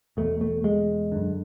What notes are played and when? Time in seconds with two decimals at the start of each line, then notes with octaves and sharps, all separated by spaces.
0.17 E2 B2 A3
0.41 A3
0.64 G#3
1.12 F#2 D3